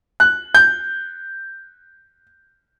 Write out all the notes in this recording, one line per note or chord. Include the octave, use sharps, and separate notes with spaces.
F#6
G6